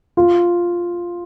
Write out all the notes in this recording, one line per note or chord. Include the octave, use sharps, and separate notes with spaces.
F4